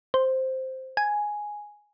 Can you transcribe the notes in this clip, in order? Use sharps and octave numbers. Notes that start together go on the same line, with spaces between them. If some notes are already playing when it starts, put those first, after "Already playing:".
C5
G#5